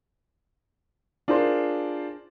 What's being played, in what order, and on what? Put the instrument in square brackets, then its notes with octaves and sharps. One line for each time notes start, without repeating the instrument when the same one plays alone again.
[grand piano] D4 F4 G#4 A#4 C5 C6